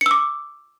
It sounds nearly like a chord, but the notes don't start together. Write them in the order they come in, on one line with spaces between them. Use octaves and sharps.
C#7 E6 D6